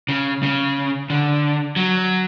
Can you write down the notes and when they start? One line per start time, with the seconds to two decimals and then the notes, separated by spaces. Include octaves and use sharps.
0.09 C#3
0.43 C#3
1.10 D3
1.76 F#3